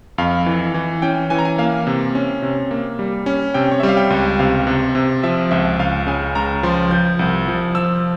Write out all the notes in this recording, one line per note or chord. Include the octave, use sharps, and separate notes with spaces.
F2 F5
E3
E3
C#4 G5
E3 G#5
A#5
G#5
A#3 F5
C3
C#4
C3
A#3
G3
C#4
C3 G5
C#5
E5
G3
F5
G5
C#2
C3 F5
C3
C3
F3 E5
C#2 E5
C#2 F5
C#3 G#5
C#2 A#5
F3 C6
F3 G6
C2
F3
F3 E6